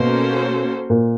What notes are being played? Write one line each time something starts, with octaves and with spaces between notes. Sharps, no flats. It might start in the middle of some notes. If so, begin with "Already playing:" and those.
Already playing: B2 A#3 C#4 F#4 A4 C5
A#2